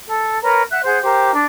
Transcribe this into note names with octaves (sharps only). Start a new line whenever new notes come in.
A4
A#4 B4 C#5 A#5
E5 F#5 F#6
G#4 C5 F#5 G6
G4 A#4 C5
D4 D5